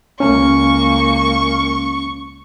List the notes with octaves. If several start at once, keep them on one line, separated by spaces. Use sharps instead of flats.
C#2 A#3 C#4 C#6